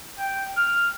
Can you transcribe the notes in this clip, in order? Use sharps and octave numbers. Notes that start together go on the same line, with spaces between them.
G5
F6